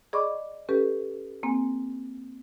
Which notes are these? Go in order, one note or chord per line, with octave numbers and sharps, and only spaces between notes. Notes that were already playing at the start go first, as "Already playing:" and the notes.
G#4 D5 D#5 B5 C#6 D6
C#4 G4 A4 B4
A#3 C4 G#5